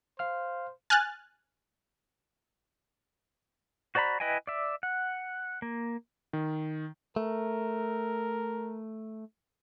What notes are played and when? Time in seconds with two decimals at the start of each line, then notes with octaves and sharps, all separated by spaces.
0.19 C5 F5 F6
0.90 G#5 F6 F#6 A6
3.95 F#4 C5 D5 A#5 B5
4.20 E4 B4 D#5 G5 G#5
4.47 D5 E5
4.83 F#5
5.62 A#3
6.33 D#3
7.16 A3 A#4